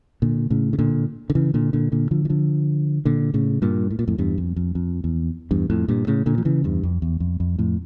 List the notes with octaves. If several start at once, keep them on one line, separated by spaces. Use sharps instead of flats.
A#2 D3
A2 C#3
C#3
A#2 D3
D3
C#3 E3
A#2 D3
A#2 D3
A#2 D3
D3 F3
E3
D3 F3
A#2 D3
A2 C#3
G2 A#2
A2
A#2
F2 A2
E2 G2
F2
F2
F2
E2
E2 G2
F2 A2
G2 A#2
A2 C#3
A#2 D3
F3
C#3 E3
E2 G2
F2
E2
F2
F2
F2 A2